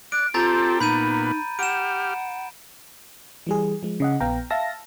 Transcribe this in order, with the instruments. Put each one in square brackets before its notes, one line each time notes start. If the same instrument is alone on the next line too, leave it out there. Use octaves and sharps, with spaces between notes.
[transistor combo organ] D5 [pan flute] F#6 [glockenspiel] D7
[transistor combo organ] C4 G4 A4 [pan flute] F4 [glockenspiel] A#5 G6 A6
[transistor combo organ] A#2 B3 [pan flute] D#4 [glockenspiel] B5 G6 D#7
[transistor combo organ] G4 F6 [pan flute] F#5 [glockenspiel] D7 E7
[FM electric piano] E3 G3 G#4
F3 G#3
C#3 D#5 F#5
A#1 B3 F5 G5 A#5
E5 F5 A5 E6 A#6